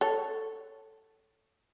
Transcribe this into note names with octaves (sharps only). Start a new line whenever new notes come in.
A4 C#5